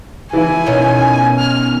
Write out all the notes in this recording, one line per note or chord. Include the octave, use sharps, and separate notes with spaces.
E3 E4 G#5
B2 D#3 C#4
F6